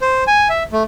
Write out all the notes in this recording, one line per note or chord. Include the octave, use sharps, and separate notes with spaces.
C5
G#5
E5
A3